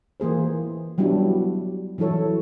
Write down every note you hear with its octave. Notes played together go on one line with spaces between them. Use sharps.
E3 A#3 G#4 C5
F#3 G3 B3 D4 E4 F#4
E3 F#3 E4 A4 C#5